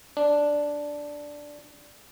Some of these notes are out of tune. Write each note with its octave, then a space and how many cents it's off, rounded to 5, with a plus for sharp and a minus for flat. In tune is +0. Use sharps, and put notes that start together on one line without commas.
D4 -5